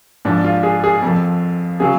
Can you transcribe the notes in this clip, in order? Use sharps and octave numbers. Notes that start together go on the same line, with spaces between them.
G#2 F3 D4
F4
G#4
G#4
F2 F3
C#3 F#3 G#4